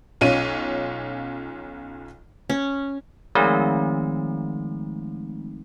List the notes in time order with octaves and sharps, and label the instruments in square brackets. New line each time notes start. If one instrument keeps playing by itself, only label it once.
[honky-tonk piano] B1 C#4 F4 D#7
[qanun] C#4
[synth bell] D#3 F3 G#3 A3 C4 D#4